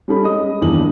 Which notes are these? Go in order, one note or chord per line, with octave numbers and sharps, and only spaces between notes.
G3 C#4 D#4 A4 B5
G#3 D#5 D#6
G#3
D#1 E2 D#3 D4 F#7